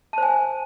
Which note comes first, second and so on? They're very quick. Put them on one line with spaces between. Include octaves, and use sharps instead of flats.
A5 C5 G#5